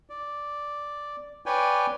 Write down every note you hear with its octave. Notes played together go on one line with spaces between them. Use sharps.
D5
B4 C#5 D5 G5 G#5